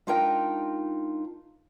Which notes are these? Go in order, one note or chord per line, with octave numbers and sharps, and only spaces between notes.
G#3 D4 D#4 F4 A#4 G5